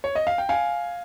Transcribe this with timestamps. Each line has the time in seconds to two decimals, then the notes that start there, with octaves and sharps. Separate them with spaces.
0.04 C#5
0.15 D#5
0.27 F5
0.38 G5
0.49 F5 G#5